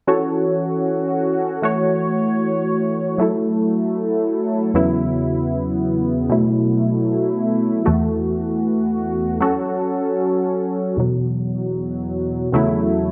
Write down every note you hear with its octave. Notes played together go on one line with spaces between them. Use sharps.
E3 C#4 F#4 A4 C#5
E3 A3 F#4 C#5
F#3 A3 E4 A4
E2 C#3 F#3 B3 E4
B2 F#3 A3 E4
E2 E3 A3 F#4
F#3 C#4 F#4 A4
E2 B2 F#3
E2 C#3 F#3 A3 E4